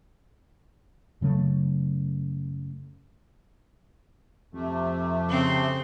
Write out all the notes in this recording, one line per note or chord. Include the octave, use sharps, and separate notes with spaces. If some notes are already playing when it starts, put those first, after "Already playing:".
F#2 C#3 F#3 A3
F2 C3 A3
C#3 C4